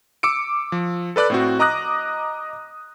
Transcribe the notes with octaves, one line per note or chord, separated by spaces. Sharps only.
D6 E6 C#7 D7
F3
A4 B4 D5 B5 F#6
A2 C4 F#4
D#5 A#5 D6 D#6 F#6 A#6